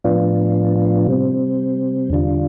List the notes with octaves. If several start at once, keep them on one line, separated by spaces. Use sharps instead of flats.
A2 F3 B3 D4 F4
C3 G3 C4
E2 D3 G3 D4 F4